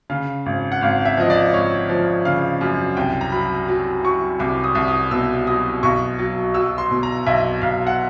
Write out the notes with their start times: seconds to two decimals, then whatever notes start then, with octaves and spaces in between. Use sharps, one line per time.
0.10 C#3 F5
0.46 G#1
0.72 F#5
0.81 G#1 F5
1.05 E5
1.17 F3 D#5
1.30 D5
1.54 G#1 C#5
1.89 F3
2.25 C#3 F5
2.61 F#2
2.97 C2 G5
3.21 A#5
3.32 F#3 B5
3.68 F#3
4.04 F#3 C#6
4.40 C2 D6
4.64 D#6
4.75 C2
4.88 D#6
5.11 B2 E6
5.47 F#3 D#6
5.83 B1 C#6
6.19 F#3
6.54 F#3 E6
6.78 C6
6.91 B2
7.03 A#5
7.27 B1 E5
7.62 B1 F5
7.87 F#5